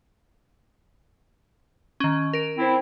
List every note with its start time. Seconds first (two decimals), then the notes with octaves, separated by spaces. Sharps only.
2.00 D#3 C#4
2.33 A#4 D7
2.58 C4 E4